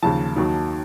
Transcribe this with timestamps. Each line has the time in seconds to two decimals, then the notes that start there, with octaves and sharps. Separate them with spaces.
0.03 D#2 C#3 F3 A5
0.36 D#2 D#3 F#3